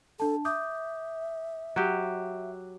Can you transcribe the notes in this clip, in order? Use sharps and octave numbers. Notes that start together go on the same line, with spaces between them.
D4 A4 A5
E5 D6 D#6 G6
F#3 G4 F#6